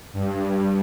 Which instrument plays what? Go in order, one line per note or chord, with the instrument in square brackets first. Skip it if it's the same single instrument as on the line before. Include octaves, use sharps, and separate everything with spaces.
[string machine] G2